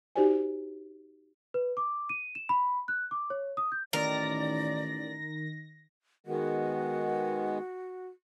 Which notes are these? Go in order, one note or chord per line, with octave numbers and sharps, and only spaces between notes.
D#4 F#4 G4 C5 D5 G#5
B4
D6
D#7
E7
B5
F#6
D6
C#5
D#6
G6
A1 D#3 A#4 D5 A#6
D#3 G#3 B3 F#4